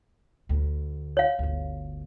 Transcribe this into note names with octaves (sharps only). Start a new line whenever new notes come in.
D2
C#5 F5
G1 D2